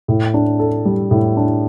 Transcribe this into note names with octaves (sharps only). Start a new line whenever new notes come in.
A2
D4
A4
G3
A2
D4